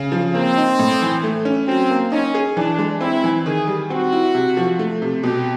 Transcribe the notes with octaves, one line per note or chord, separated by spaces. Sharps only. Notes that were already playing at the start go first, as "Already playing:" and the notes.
Already playing: C#3
F3
A#3 C4
D#4
A2
E3
A3
C#4
F#3 C4
A#3
C#4 D#4
G#4
E3 D4
G#3
C4 E4
E3
D#3 G#4
G3
C4 F#4
E4
C3
F3
A3
C3
B2 G4